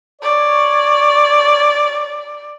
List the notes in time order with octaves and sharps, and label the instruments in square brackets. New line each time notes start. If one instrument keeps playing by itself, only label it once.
[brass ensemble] C#5 [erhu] D5